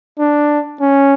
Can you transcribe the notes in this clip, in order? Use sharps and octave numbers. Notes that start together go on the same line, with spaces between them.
D4
C#4